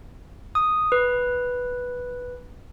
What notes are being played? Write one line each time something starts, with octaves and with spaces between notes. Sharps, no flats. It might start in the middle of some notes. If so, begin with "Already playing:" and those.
D#6
B4